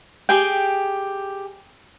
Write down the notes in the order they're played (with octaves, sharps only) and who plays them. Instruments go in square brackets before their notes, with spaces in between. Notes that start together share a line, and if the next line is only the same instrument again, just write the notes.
[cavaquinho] G4 G#4 G5